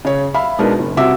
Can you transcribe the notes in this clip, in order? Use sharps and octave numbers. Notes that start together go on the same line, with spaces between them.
C#3 C#5
E5 F5 B5
B2 G#3 D4 D#4 A#4 B4
F#1
C2 C3 F#4 E5 D6 E6